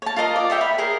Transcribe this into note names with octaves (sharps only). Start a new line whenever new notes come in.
C#5 A5
F4 A#4 D#5 D#6
D5
C#5 E5 G5
B5
G#4 A#4 D#5